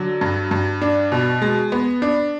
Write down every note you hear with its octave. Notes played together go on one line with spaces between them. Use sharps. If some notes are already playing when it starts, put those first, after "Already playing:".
Already playing: D3 F#3
G2
G2
D4
B2
G#3
B3
D4